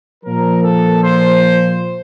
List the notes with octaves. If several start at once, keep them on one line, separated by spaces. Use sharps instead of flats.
A#2 F3 A#4
A4
C5